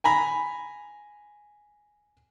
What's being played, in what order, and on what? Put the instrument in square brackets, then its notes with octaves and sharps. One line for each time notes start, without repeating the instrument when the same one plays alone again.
[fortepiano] G#5 A#5 B5